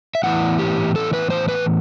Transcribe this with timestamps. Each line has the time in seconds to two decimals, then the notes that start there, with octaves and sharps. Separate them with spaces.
0.15 E5
0.23 A2 E3 B3 E4 F#5
0.59 G4
0.96 A4
1.13 B4
1.30 C5
1.48 B4